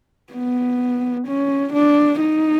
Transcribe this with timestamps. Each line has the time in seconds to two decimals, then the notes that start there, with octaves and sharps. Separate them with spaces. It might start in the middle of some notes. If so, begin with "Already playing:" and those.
0.33 B3
1.27 C#4
1.73 D4
2.20 D#4